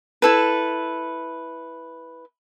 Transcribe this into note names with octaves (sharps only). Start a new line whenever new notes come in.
E4 A4 B4